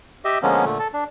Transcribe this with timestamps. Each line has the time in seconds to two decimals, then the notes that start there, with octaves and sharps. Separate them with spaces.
0.25 G4 D#5 E5
0.43 D3 F3 G#3 A#3 B3 C#4
0.65 A#2 D3 A3
0.79 A4
0.93 D4